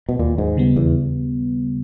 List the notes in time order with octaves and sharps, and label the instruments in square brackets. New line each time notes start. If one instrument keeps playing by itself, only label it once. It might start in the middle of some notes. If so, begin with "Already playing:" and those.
[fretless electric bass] B2
[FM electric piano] D#2 [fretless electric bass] A#2
[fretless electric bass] G#2
[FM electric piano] C#3 G3 B3
[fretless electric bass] E2